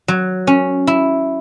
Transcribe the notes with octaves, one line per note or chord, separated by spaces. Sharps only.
F#3
C#4
E4